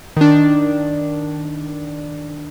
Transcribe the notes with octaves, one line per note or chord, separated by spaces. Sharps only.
D#3 D4